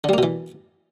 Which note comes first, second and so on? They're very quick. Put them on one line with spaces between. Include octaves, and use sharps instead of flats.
D3 G3 A#3 B2 E3